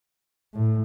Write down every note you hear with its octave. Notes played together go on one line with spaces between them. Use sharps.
A2